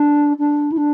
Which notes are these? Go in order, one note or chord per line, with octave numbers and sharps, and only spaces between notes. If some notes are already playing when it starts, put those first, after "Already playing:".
Already playing: D4
D4
E4
D4